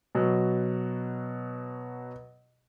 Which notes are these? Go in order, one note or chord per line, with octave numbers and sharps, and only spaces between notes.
B2 F#3